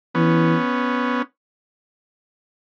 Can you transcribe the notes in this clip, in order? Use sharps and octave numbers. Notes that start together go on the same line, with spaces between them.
E3 B3 C#4